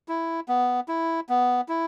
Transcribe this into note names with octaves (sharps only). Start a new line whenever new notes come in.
E4
B3
E4
B3
E4